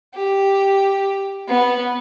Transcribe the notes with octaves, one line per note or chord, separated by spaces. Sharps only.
G4
B3